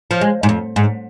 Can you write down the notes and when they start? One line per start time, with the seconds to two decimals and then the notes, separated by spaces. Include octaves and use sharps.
0.11 F3
0.21 G#3
0.43 G#2
0.49 F2
0.76 G#2